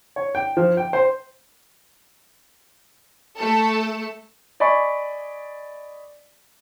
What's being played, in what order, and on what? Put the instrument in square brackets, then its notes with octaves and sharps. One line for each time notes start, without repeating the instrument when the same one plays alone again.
[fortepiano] C#5
G5
F3
G5
C5
[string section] A3 A4
[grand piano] D5 D#5 G#5 B5 C#6